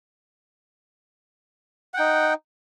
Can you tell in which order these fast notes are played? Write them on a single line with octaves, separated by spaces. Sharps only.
F#5 G5 D#4